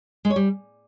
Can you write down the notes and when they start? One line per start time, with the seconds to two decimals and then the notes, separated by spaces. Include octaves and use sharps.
0.25 G#3
0.30 C#5
0.36 G3